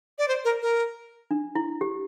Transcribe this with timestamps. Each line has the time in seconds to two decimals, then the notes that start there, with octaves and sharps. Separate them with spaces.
0.18 D5
0.28 C5
0.45 A#4
0.62 A#4
1.31 D4
1.55 E4
1.81 G4